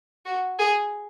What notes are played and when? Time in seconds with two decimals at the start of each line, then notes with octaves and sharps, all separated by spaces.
0.26 F#4
0.59 G#4